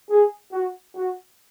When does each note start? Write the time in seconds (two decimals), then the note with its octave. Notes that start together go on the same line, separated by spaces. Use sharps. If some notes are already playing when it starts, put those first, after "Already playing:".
0.10 G#4
0.52 F#4
0.95 F#4